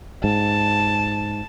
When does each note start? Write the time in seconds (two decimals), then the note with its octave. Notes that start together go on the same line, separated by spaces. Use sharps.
0.24 G#2 A5